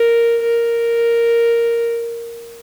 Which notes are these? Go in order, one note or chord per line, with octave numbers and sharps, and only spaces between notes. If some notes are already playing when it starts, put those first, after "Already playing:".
Already playing: A#4
A#4